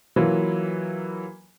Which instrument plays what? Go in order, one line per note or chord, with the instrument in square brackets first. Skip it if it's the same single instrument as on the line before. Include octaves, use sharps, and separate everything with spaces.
[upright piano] E3 F#3 A#3 F4 B4